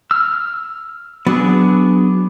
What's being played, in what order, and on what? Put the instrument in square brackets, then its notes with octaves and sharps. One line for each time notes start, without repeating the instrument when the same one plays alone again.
[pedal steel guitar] E6 F6
[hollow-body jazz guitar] F#3 [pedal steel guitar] B3 D4 G#4